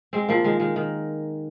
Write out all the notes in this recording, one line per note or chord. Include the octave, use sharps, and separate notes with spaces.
G#3 C4
F3 A#3
D#3 G#3
D#3 G#3
D#3